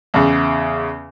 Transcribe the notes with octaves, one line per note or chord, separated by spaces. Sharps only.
E2 C#3